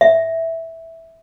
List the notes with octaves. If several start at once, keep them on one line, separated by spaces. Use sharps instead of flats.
E5